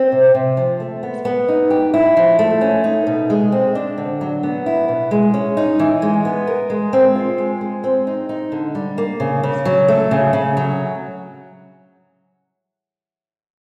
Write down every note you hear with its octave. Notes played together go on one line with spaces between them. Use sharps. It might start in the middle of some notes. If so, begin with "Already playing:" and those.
Already playing: C4
C3
C3
F3
A3
B3
B3
D#4
G4
E4
F3
A3
C#4
D#4
B2
G#3
C4
D4
D3
F#3
B3
E4
B2
G#3
C#4
D#4
E3
G#3
B3
A#4
G#3
C4
F4
G#3
G#3
C4
D#4
D#4
D3
G3
A#3
C#3
C#3
F#3
A3
C#3
C#3
F#3